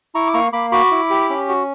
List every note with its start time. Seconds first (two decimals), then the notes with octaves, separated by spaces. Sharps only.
0.15 E4 A#5 C#6
0.27 D6
0.34 A#3 A#5 C#6
0.53 A#3 B5 D6
0.72 F#4 B5 D6
0.91 E4
1.10 G4
1.29 C#4
1.49 F#4